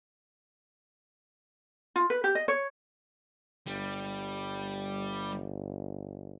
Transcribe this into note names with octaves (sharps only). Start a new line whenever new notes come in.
F4
B4
G4
D#5
C#5
G1 G3